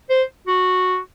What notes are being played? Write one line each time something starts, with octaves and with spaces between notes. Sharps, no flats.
C5
F#4